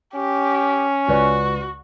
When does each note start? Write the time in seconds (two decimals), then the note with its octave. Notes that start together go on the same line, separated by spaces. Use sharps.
0.15 C#4 G4
1.08 C#2 F#4 B4 D5